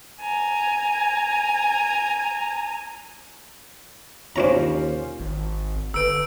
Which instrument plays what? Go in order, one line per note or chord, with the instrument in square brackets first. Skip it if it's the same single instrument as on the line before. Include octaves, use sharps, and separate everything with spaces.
[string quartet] G#5 A#5
[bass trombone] D#2 [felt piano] C#4 F4 C5 [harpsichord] D4 C#5 A#5
[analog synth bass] G#1
[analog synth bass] G1 [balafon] D3 B4 [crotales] E6 D7